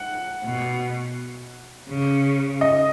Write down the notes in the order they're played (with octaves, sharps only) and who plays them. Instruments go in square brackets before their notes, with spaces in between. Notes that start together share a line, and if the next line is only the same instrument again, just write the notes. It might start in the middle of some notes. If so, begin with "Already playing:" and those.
Already playing: [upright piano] F#5
[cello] B2
C#3
[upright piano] D#5